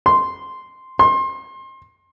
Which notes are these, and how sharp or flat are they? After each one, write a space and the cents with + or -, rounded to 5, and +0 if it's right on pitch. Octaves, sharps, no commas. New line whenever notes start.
C6 -5
C6 +30